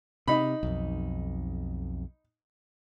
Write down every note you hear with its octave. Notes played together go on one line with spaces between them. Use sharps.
C3 D#4 B5
B1 F2